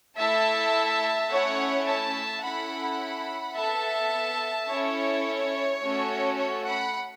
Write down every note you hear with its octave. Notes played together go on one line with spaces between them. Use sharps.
A3 E4 A4 E5 A5
A3 C#4 E4 C#5 F#5
E5 A5
C#4 E4 A4 F#5 B5
B3 A4 E5 A5
C#4 E4 A4 C#5
A3 C#4 F#4 A4
C#5
F#5 B5